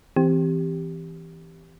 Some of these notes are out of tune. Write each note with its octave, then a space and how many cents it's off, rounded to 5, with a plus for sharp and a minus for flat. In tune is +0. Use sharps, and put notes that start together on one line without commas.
E3 -10 C4 -10 G4 +0